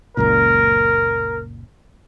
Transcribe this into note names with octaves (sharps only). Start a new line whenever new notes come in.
F#1 C#2 A#2 A#4